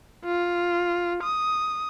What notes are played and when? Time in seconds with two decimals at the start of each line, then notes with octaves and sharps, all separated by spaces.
0.25 F4
1.23 D#6